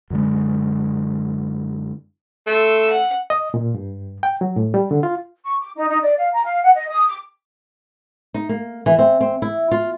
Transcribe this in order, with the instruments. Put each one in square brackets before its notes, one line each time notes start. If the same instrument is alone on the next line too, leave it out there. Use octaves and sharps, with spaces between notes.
[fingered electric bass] F#2 D3 G#3
[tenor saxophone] A3 [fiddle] C6 E6
[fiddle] F#5
[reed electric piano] D#5
A#2
G2
G5
F#3
A2
G3
D3
F4
[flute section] C#6
D6
D#4
D#4
D5
F5
A#5
F5
F#5
D#5
D#6
D6
[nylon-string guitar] D#4
A#3
E3
C4
C4
E4
F4